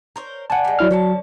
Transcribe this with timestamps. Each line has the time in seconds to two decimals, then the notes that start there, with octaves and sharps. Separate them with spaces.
0.16 A#4 C5 C#5
0.50 D4 F#4 F#5 G#5 A5
0.64 G3 G#3
0.79 F#3 E4 F6
0.91 D3 F#3 C#4 A5